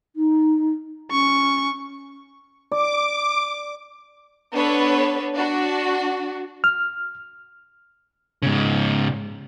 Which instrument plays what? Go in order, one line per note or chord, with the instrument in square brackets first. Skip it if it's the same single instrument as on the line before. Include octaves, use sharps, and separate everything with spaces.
[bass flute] D#4
[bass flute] C#4 [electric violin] C#6
[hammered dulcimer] D5 [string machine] D6
[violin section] B3 D4 A4 B4 C#5
D4 F#4
[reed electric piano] F6
[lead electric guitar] G#2 C#3